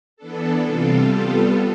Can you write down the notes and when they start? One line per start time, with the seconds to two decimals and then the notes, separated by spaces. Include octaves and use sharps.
0.16 E3 B3 D4 A4
0.62 C3 G3 C4 F4 A4
1.06 G3 B3 F4 A4